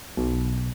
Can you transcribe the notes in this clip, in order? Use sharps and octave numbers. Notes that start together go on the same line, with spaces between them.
B1